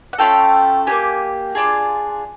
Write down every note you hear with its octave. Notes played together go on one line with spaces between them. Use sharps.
F#5
A3 C#4 F4 A4 G5
A#3 D4 G4 G#5
D4 F4 G#4